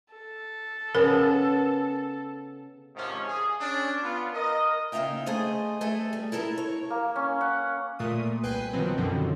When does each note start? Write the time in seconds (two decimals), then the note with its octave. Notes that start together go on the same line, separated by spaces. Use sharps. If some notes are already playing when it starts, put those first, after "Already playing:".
0.13 A4
0.95 C#3 B3 A#4
2.95 G#2 C3 D#3 F3 C#4
3.26 G#4
3.60 C#4 D4
4.02 B3 F4
4.33 A#4 D#5
4.92 C#3 A#3 D#4 E5 F5 G5
5.26 A3 G#4 A4 C5 D#5
5.81 A3 G#4 A4
6.13 G3
6.32 E4 A4 A#4 A5
6.58 C#5
6.90 A#3
7.16 C#4
7.41 F#5
7.99 A#2 A3 D#6
8.43 C2 B4 G5 G#5 F#6 C7
8.73 B2 D#3 F3 F#3 C4
8.98 F#2 B2 D3 D#3 F3 C4